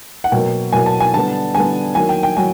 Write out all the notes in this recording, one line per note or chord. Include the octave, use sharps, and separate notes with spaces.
F#5
B2 F#3 A#3 G5
B2 F#3 A#3 G#5
A5
G#5
D3 G3 B3 A5
D3 G3 B3 G#5
D#3 F#3 A#3 G#5
G5
G5
D#3 F#3 G#5